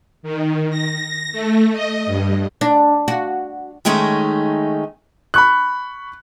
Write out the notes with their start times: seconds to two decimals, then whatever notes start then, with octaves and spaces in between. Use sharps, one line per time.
0.23 D#3
0.70 A#6
1.32 A3
1.72 D#5
2.06 G2
2.61 D4
3.08 F#4
3.85 D#3 G#3 A3 C#4 D#4
5.34 B5 C#6 F#6